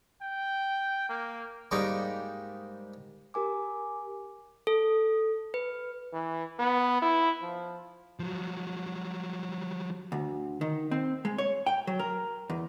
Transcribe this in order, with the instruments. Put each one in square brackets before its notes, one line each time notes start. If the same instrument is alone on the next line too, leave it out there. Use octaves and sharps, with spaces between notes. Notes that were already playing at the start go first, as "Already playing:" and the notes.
[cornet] G5
A#3
[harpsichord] G#2 G3 A#3 D#4 C#6 D6
[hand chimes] G4 A#4 G#5 D6
A4
B4
[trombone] E3
B3
E4
F3
[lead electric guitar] F3 F#3
[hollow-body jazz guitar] D2
D#3
C4
G#3
C#5
G5
F#3
A#4
E2